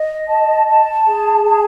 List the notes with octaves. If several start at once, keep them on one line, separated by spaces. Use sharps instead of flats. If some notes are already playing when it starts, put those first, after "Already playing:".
Already playing: D#5
A5
A5
G#4
G#4